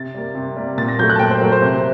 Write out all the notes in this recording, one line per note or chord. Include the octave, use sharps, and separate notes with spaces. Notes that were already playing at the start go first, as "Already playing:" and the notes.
Already playing: C3 A6
G3 A#3
C3
G3 A#3
A#2 A6
A#6
F#3 A3 G6
F#6
A5
A#2 G5
C5
F#3 A3 A#4
C5
C3 C5